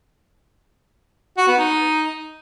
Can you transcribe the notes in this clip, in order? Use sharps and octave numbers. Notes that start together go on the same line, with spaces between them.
F#4
B3
D#4